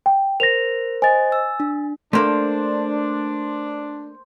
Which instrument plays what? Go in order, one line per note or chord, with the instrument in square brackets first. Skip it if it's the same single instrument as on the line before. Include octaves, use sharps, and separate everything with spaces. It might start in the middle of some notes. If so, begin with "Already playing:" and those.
[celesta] G5
[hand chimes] A#4 C5 [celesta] A#6 F7
[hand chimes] C5 D#5 [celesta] G#5 A6
[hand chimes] E6
D4
[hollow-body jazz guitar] A3 A#3 [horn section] D4 [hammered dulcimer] C5